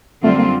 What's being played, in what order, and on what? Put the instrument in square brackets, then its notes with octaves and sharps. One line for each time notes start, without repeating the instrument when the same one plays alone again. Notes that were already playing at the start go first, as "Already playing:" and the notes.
[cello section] F#2 D3 G3 C4 F4 [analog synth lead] A3
[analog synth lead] A#3